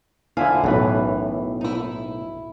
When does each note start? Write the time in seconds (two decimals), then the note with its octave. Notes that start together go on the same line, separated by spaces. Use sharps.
0.37 F2 D3 E4 E5 F5 G#5
0.64 B1 F#2 A2 E3 B4
1.61 D#4 E4
1.75 E4